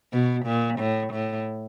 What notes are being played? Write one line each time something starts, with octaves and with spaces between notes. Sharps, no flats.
B2
A#2
A2
A2